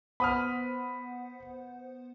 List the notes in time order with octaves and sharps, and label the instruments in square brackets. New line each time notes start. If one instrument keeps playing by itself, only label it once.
[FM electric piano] B3 C5 F#5 [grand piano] B5 D#6 F6